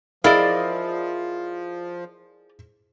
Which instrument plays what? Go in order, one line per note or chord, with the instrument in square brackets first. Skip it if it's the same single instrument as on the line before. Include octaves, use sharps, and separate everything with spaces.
[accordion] F3 [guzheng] E4 [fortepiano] G#4 F5 [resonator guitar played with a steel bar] A#4 D5 D#5